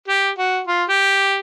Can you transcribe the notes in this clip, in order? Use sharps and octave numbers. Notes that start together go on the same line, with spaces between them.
G4
F#4
F4
G4